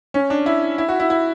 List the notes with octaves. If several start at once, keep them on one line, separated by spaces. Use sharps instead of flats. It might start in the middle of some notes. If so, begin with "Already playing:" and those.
C#4
D4
E4
E4
F#4
E4
E4